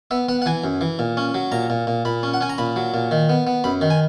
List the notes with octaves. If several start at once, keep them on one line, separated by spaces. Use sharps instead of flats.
B3 E5
B3 F#5
F#5
E3 G#5
F#2
E3
A#2
C#4
F#3
A#2 A#5
A#2
A#2
A#2 B5
C#4
F#5
C#4 G#5
A#5
A#2 B5
F#3
A#2
D#3
B3
B3
F#2 B5
D#3
G#5